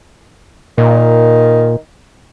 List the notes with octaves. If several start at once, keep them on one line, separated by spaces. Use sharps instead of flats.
A#2 D#3